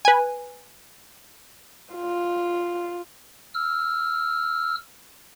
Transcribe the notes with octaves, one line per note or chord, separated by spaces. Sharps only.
B4 G#5
F4
E6 F6